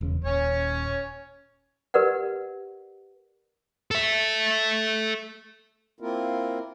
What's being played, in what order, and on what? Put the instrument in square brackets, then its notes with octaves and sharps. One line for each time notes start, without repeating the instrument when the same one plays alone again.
[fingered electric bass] E1 E2 C#3
[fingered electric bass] D#1 [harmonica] C#4 C#5
[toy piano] G4 A#4 B4 D5 F#5
[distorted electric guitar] A4 E5
[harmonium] A#3 C4 E4 F4 A#4